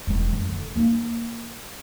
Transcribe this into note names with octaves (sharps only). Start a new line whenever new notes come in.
E1 D#3
F#2
D3
A#3 D#4